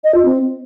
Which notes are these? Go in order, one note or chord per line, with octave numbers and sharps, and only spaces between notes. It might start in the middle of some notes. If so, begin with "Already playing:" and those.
D#5
F4
C4